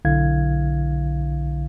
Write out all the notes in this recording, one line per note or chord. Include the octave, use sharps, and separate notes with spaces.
B1 D3 E4 F5 G#6